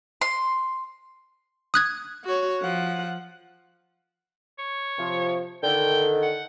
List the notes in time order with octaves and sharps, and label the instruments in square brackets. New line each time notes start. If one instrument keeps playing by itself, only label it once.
[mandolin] C6
[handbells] D#6 F#6 G#6
[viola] F#4 C#5
F3 F#5
[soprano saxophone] C#5
[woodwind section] C3 F3
[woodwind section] D3 D#3 [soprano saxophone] G5
[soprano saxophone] F#5